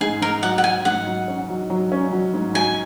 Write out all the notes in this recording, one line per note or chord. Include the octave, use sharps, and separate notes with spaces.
G#2 G#4
G#2 A#4
F#3 F#5
F#5
F#3 G#5
G#2 F#5
F#3
C#4
F#3
F#3
C#4
F#3
G#2
F#3 G#5